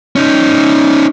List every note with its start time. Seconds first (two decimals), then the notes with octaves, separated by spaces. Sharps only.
0.16 C#4 D#4